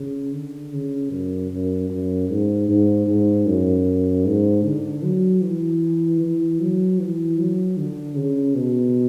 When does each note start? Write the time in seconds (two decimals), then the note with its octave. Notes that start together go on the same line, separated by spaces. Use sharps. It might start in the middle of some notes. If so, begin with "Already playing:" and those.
Already playing: C#3
0.33 D3
0.73 C#3
1.11 F#2
1.51 F#2
1.90 F#2
2.29 G#2
2.69 G#2
3.07 G#2
3.46 F#2
4.25 G#2
4.64 D3
5.03 F#3
5.42 E3
6.21 E3
6.60 F#3
6.99 E3
7.38 F#3
7.77 D3
8.16 C#3
8.55 B2